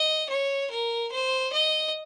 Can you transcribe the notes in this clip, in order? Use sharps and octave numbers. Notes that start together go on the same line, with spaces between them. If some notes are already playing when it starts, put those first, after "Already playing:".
Already playing: D#5
C#5
A#4
C5
D#5